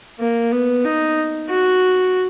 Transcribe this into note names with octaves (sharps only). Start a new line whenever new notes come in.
A#3
B3
D#4
F#4